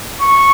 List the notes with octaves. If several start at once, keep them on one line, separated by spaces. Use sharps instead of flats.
C#6